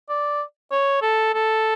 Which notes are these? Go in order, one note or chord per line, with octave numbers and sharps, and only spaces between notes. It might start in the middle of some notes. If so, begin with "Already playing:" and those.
D5
C#5
A4
A4